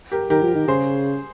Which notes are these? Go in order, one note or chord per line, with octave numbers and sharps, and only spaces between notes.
G4 A#4
D#3 G4 A#4
F3
D#3
C#3 G#4 C5